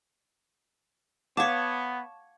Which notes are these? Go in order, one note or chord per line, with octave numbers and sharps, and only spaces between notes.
B3 C#5 F5 F#5 A5 D6